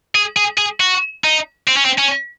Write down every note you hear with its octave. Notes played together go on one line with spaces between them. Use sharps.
G#4
G#4
G#4
F#4
D#4
C4
C#4
C4
C#4